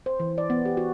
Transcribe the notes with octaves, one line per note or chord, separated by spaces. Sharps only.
C5
E3
D5
B3
G4
F#4